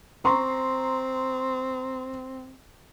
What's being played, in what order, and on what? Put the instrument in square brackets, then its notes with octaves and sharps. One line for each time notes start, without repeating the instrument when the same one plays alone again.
[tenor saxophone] C4 [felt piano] A#5 C6 C#6